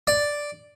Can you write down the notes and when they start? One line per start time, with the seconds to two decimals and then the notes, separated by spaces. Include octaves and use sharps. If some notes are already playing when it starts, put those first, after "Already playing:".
0.07 D5